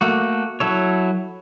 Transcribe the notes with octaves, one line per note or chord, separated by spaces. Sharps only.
A3 A#3 F#4
F#3 E4 A4 C#5